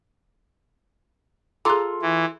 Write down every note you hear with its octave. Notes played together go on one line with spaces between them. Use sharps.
F4 G#4 A4 A#5 D6
E3